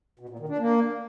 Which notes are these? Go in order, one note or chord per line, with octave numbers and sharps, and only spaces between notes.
B2
A#2
D#3
D4
A#3